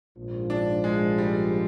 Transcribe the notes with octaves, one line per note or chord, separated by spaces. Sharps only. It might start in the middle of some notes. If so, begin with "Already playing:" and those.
A#1 G#2 F3
D4
G#3
G3